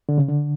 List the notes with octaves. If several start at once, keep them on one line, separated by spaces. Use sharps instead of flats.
D3
C#3
D3